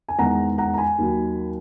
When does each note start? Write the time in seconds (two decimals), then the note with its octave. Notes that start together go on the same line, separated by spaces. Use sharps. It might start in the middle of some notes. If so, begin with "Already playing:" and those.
0.08 G#5
0.19 E2 D#3 G#3 D#4 F#5 A#5
0.58 F#5 A#5
0.74 A#5
0.78 G#5 B5
0.98 D#2 D#3 F#3